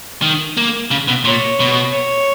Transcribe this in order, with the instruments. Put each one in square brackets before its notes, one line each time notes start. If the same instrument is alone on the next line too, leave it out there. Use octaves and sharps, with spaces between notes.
[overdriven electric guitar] D#3
A#3
C#3
B2
[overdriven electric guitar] A#2 [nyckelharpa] C#5
[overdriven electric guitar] B2
[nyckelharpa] C#5